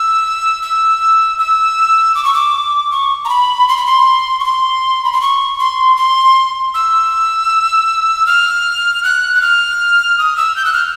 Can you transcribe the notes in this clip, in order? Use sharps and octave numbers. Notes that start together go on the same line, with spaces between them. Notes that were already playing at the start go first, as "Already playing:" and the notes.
Already playing: E6
E6
E6
D6
C#6
D6
C#6
A#5
B5
C6
B5
C6
C#6
C6
B5
C6
C#6
C6
C6
E6
F6
F#6
F#6
F6
D#6
E6
G6
F#6
F6